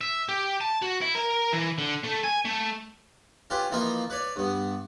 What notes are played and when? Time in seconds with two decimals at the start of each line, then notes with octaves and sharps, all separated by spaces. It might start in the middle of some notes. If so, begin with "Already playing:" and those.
0.01 E5
0.29 G4
0.61 A5
0.82 F#4
1.01 E4
1.15 A#4
1.53 E3
1.78 D3
2.03 A3
2.23 G#5
2.45 A3
3.50 C#4 F4 G4 B4
3.72 E3 F3 A#3 D#4 F4 A#4
4.10 B4 C#5 D5
4.36 G2 B3